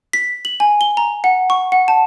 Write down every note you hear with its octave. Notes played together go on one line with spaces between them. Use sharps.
B6
F#7
G#5
G7
A#5
F#5
C#6
F#5
A5